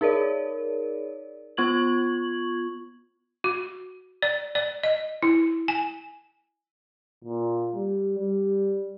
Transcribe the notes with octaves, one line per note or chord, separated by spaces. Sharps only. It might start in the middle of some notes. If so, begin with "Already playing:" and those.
D#4 G#4 A#4 C#5 D5
B3 F4 C#6 G#6 F#7
F#4
D5
D5
D#5
E4
G#5
A#2
G3
G3